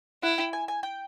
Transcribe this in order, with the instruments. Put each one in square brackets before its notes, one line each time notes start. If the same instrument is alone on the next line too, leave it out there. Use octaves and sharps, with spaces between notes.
[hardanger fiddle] E4 [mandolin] F#5
[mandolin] G5
G#5
G#5
G5